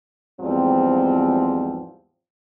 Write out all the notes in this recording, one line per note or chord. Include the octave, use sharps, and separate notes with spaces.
E2 G#2 F3 G3 C4